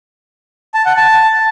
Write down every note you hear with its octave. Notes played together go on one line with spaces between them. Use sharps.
A5
F#5
A5